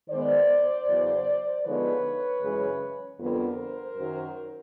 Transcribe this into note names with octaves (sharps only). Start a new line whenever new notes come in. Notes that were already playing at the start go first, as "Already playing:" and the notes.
D#3 G#3 B3 C5 D5
E2 C#3 F#3
D3 F3 G#3 B3 D#4 B4 C#5
F#2 C#3 E3 G#3 C#4
F2 D3 G3 B3 A#4 C5
F#2 D#3 F#3